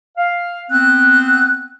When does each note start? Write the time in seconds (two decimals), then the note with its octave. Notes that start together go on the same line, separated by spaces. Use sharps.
0.18 F5
0.71 B3 C4 F#6